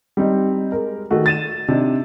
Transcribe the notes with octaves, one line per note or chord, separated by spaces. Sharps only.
G3 C4 D#4
G#3 A#4
D#3 A3 F#4
A6 D#7 E7
C3 D4 D#4